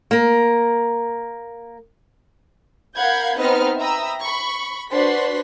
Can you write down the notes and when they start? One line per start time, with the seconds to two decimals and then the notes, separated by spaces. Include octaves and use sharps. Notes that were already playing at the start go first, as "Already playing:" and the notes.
0.11 A#3 A#4
2.96 A#4 F5 F#5 B5 G6 G#6
3.37 B3 C4 D#4 B4 D#5 F6
3.77 E5 G5 A#5 B5 D#6 E6
4.22 B5 C#6
4.91 D4 F#4 B4 C5 C6 B6